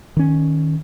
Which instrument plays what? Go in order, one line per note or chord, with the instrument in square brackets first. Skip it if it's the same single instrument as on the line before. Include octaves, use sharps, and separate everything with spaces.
[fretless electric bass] D#3 C#4